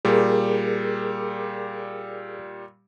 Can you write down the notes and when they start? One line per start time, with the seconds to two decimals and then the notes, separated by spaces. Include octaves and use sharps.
0.05 A#2 G3 G#4 A#4